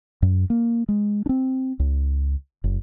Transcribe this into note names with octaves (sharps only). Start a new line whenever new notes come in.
F#2
A#3
G#3
C4 D4
C#2
F#1